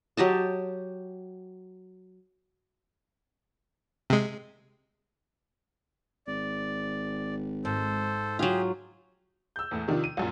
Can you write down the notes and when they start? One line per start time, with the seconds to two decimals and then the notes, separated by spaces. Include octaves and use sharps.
0.17 F#3 G4 D#5 A5
4.10 C3 G#3
6.27 G#1 D5
7.65 G#2 A4 C5
8.39 F#3 F4 G4 G#4
9.56 E6 G6
9.71 E2 A2 A3
9.88 C3 D#3 F3 D4 F4
10.04 D#7
10.17 C2 F#2 A#2